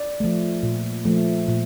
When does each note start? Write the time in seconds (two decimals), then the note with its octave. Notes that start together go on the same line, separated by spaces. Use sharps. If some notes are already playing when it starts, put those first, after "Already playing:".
Already playing: D5
0.20 F3 A3
0.63 A#2
1.05 F3 A3
1.48 A#2